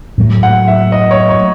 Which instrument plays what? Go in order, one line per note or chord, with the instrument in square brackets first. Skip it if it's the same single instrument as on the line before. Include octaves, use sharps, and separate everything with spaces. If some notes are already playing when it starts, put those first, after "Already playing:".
[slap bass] A2 F#3 A3
[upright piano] F#5
E5
D#5
C#5
C#5